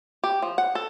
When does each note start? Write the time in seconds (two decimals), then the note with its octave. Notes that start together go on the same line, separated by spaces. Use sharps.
0.24 G4
0.42 F3
0.58 F#5
0.75 A4